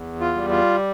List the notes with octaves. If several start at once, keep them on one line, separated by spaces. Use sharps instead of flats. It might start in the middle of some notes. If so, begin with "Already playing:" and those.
Already playing: E2
F4
G3
F4